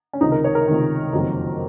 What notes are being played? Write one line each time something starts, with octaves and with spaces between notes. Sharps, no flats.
C#4
C#2 C3 D#3 D#4
A#4
C#5
A#4
C#2 C3 D#3
F#1 F2 D#3 F#3